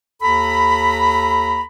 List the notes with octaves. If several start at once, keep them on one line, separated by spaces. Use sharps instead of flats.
D#2 A4 A#5 B5